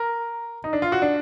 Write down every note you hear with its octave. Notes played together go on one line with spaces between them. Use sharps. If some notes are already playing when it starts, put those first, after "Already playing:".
Already playing: A#4
D#4
D4
F4
F#4
D4